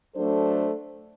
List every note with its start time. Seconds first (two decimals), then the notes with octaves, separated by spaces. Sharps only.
0.16 F#3 A3 D4 A4 C5